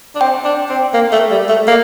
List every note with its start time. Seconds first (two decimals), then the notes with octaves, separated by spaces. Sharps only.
0.15 D4
0.21 C4 G5
0.45 D4
0.70 C4
0.94 A#3
1.13 A3
1.31 G3
1.49 A3
1.68 A#3